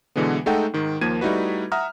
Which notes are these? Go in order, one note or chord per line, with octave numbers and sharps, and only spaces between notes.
B2 D3 E3 G#3 B3
G#3 A3 D#4 A4 F#5 G5
G#2 D#3
D#2 F3 A#3 G#6 D#7
G3 A3 D#4 E4 F#4 B4
E5 F#5 A#5 D#6 F6